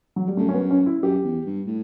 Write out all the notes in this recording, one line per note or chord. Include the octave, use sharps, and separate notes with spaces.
F#3
G3
F#2 A3
C#4
B3
C#4
E4
F#2 G4
E2
G2
A2